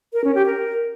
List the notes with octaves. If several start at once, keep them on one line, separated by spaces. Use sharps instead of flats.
A#4
C#4
G4
A#4